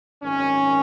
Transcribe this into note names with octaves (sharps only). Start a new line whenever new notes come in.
G#1 F#2 D#3 C#4